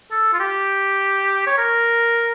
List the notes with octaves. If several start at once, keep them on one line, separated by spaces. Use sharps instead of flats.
A4
F4
G4
C#5
A#4